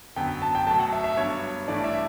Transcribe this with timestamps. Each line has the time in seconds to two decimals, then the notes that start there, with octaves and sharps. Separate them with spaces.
0.16 F#2 D3 F#3 B3 G5
0.42 A5
0.55 G5
0.67 B2 F#3 A3 A5
0.80 F#5
0.93 E5
1.04 E5
1.17 G2 F#3 B3 C#5
1.68 G2 E3 A3 D5
1.84 E5